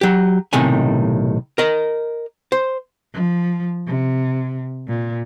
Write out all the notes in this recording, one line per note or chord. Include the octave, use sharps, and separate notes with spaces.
F#3 G4
B1 A2 C3 D#3 G#5
A#4 D#5
C5
F3
C3
A#2